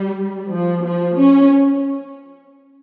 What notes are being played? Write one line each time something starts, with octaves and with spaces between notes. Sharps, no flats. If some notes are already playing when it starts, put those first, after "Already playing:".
Already playing: G3
F3
F3
C#4